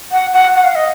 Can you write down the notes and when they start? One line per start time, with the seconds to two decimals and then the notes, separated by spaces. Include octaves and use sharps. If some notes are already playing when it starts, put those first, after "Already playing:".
0.12 F#5
0.33 F#5
0.55 F#5
0.64 F5
0.75 D#5